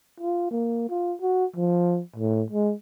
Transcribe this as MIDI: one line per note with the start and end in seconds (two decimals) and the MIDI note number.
0.20 0.47 65
0.51 0.86 58
0.90 1.15 65
1.21 1.45 66
1.56 2.01 53
2.16 2.43 45
2.50 2.73 56